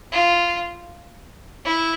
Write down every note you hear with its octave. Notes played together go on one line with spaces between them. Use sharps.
F4
E4